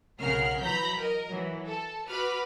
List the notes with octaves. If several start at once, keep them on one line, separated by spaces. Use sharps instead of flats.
B1 C#3 A#4 F#5 F6 C7
E3 F#3 A#5 B5 G6 B6
A#4 D#5
E3 F#3
A4
F#4 B4 B5 D6 F6